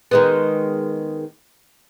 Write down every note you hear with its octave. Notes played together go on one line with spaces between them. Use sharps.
D#3 G#3 B3